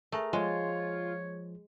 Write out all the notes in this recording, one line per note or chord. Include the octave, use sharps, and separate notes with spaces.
A3 G#4 A#4 A#5
F3 G#3 F4 C#5